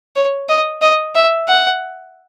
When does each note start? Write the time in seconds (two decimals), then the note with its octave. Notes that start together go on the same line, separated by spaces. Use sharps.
0.16 C#5
0.49 D#5
0.82 D#5
1.15 E5
1.48 F#5